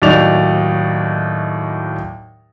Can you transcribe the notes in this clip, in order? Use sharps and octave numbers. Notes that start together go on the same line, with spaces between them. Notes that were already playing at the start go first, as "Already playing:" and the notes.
D#2 A2 F#3 D#4 D5 F7